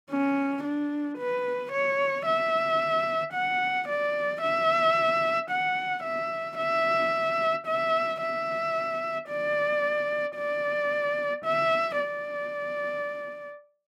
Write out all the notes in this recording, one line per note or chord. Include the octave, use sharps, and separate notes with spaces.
C#4
D4
B4
C#5
E5
F#5
D5
E5
F#5
E5
E5
E5
E5
D5
D5
E5
D5